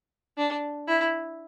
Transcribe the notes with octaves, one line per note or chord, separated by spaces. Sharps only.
D4
E4